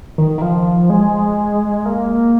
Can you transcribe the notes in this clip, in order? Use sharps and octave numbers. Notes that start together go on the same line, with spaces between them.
D#3
D#3
F3
G#3
A#3